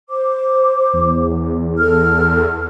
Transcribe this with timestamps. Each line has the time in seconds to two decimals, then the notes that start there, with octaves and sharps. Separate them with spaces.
0.09 C5 D6
0.93 E2
1.78 A4 F6